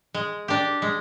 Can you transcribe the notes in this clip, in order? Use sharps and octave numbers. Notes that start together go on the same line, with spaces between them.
G#3
D4 G4
G#3